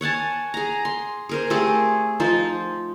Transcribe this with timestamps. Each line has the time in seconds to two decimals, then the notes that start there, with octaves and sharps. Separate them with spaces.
0.01 C#5 F#5 G#5 A5
0.54 G#4 A#5
0.85 C6
1.29 G#4 A#4 C5
1.50 A3 C4 G4 G#4
2.20 F3 D#4 C5